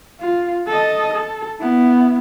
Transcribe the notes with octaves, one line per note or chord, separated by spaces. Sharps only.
F4
A4 D#5
A4
B3 E4